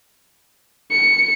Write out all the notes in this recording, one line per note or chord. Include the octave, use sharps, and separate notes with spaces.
C#7